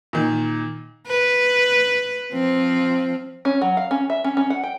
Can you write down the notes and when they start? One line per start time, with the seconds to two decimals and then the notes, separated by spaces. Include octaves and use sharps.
0.13 A#2 D#3
1.07 B4
2.32 F3 C4
3.45 C#4
3.61 F#3
3.77 F5
3.91 C#4
4.10 E5
4.24 C#4
4.37 C#4
4.50 F#5
4.63 G5